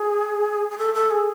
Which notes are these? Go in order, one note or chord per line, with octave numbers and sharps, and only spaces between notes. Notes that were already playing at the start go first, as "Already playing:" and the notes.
Already playing: G#4
G#4
A4
A4
G#4